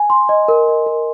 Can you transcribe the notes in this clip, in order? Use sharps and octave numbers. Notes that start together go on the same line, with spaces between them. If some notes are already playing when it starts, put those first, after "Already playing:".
Already playing: G#5
C6
D#5
A#4
D#5
A#4